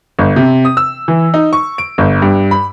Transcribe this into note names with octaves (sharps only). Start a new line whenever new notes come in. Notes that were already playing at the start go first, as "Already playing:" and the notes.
G1
C3
D#6
E6
E3
D#4
C#6
D7
G1
G2
B5